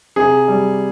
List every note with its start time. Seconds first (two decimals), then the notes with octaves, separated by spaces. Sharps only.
0.16 C3 G#4
0.48 G3